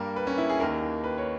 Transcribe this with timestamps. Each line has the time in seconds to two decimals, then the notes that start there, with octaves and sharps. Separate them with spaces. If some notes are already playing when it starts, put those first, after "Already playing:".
Already playing: G2 G3 A#3 A#4
0.16 B4
0.27 C#4
0.38 E4
0.49 G#4
0.60 D#2 D#3 A#3 A#4
1.04 B4
1.18 C#5